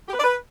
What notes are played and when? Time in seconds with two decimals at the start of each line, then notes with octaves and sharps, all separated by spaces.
0.09 G4
0.14 B4
0.19 D5
0.24 B4